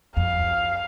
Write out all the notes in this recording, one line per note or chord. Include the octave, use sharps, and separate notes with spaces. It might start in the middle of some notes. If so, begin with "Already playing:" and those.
F2 F5